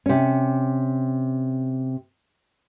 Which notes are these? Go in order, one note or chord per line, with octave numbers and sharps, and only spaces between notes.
C3 C#4